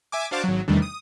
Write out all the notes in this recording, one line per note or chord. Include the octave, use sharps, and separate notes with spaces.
E5 G#5 D6
D4 F#4 C5 F5 A5 D6
G#1 F#3
E2 C3 D#3 G3 A3 D4
D#6